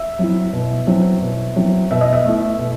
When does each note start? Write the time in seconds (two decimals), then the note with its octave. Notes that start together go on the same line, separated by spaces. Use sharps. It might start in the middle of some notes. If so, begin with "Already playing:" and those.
Already playing: E5
0.19 F#3 C4 E4
0.53 B2
0.87 F#3 C4 E4
1.22 B2
1.56 F#3 C4 E4
1.91 B2 E5
2.01 D#5
2.13 E5
2.25 A3 E4
2.59 B2